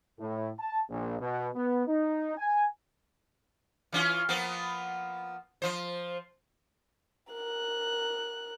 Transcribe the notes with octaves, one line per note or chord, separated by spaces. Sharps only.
A2
A5
A#1
B2
B3
D#4
G#5
E3 C#4 F4
F3 A#3 B3
F3 C5
A#4 F#6